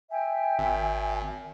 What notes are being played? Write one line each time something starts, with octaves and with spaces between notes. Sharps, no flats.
E5 G5 G#5
G#1